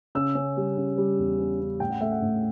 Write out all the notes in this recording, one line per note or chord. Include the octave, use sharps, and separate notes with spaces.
C#3 E6
C#4
G3
C#3
G3
E2
C#4
C#4
A2 G5
F#5
A3 E5
F#5
A2